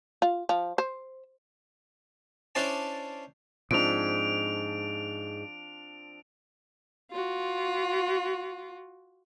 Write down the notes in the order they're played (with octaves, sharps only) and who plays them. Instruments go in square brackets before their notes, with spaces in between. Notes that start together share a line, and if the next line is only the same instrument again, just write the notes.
[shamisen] F4
F3
C5
[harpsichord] C#4 D4 E4 C5 D5 A5
[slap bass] G#2 [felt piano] F3 C4 D4 [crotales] D7 F7
[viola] F4 F#4